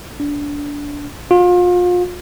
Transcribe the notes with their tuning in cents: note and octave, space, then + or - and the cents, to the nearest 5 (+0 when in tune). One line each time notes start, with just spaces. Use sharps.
D4 -20
F4 +35